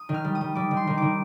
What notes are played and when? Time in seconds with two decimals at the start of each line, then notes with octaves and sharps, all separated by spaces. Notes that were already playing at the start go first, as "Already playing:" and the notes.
Already playing: D#6
0.09 D#3
0.14 F6
0.24 G3
0.35 D#6
0.41 G3
0.55 G3 D6
0.71 D#3
0.77 C6
0.87 D#3
0.98 D#3 D6